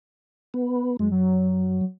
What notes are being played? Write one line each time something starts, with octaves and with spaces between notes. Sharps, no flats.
B3
F#2 G#3
F#3